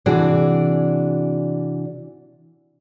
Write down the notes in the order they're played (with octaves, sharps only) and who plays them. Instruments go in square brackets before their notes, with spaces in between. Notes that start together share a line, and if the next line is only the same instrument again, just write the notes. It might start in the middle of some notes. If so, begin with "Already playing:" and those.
[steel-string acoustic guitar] C3 E3 D4 F#4 G#4 D5